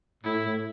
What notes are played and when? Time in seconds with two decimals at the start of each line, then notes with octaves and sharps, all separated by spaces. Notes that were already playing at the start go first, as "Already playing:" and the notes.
0.23 A2 E4
0.44 A2